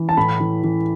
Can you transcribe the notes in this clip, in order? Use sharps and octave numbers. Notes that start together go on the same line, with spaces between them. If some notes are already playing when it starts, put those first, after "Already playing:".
Already playing: E3
A5
A2 B5
E3
E3